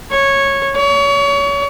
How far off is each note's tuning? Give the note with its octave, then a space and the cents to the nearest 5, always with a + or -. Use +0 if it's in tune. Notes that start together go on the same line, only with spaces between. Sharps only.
C#5 -10
C#5 +30